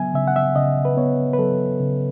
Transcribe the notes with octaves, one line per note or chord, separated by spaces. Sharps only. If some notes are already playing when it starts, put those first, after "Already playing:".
Already playing: C#3 F#3 B3 E5 G#5
C#3 E5
F#5
E5
C#3 D#5
B4
B3 C#5
B4
F#3 A4
C#3